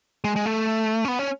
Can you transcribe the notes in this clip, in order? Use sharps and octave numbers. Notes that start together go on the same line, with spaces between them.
G#3
G#3
A3
C#4
B3
C#4